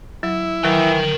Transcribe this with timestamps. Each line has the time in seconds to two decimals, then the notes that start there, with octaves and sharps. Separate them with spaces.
0.23 F#3 E4
0.64 D#3 E3 F#3 A#4 G5